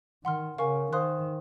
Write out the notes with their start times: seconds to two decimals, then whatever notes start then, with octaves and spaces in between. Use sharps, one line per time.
0.24 D#3 F#5 C6 F6
0.58 C#3 A#4 F5 G#5 C#6
0.93 D#3 C5 F5 C6 D#6 F#6